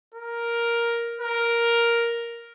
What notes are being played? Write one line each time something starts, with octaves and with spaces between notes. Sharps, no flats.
A#4
A#4